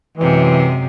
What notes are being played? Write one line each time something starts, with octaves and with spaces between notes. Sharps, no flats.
F#2 C3 E3 G#3